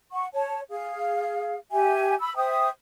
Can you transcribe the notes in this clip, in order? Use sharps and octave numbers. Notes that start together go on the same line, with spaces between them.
F#5 C#6
C#5 A5
G#4 F5
G4 E5 G#5
B5 E6
C5 E5 G5 D#6